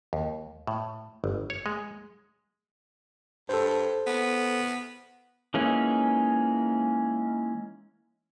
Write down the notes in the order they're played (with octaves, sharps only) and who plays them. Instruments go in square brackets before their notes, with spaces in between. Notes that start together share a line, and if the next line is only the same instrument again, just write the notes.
[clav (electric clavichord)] D#2
A2
G1
C#5
G#3
[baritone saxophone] G2 [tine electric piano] A4 C5
[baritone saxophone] B3
[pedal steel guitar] E3 G#3 A#3 C#4 D#4